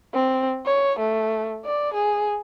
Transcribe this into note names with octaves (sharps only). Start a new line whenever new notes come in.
C4
C#5
A3
D5
G#4